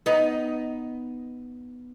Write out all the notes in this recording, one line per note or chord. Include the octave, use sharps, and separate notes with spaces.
B3 D#4